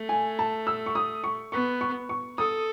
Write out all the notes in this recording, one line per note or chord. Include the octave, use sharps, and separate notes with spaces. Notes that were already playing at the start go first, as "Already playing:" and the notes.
Already playing: A3
G#5
A5
E6
C#6
D#6
C#6
B3 C#6
C#6
C#6
A4 D#6